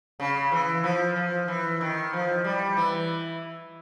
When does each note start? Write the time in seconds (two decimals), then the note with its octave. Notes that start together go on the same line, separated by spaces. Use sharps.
0.20 C#3
0.52 E3
0.84 F3
1.16 F3
1.48 E3
1.81 D#3
2.13 F3
2.44 G3
2.77 E3